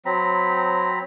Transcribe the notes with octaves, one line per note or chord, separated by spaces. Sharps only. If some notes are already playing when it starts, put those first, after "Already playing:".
F#3 C4 A#5 B5